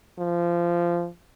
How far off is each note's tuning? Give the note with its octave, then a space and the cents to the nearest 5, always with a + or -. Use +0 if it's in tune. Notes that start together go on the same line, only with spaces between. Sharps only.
F3 -20